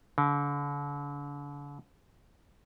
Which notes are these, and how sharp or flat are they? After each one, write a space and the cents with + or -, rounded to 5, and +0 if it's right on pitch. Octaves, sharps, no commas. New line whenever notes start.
D3 -40